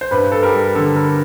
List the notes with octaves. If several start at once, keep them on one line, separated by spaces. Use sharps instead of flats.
C5
G2 B4
A4
G3 A#4
D3 A4
A#4